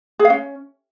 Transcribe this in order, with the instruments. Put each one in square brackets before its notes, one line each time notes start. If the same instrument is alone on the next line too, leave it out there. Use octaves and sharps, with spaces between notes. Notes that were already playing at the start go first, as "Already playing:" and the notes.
[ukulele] G#4
F5
C#4